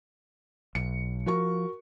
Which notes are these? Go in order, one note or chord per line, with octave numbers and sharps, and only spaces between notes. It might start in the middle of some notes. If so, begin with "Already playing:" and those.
B1 C#7
F3 F#4 A#4 C#6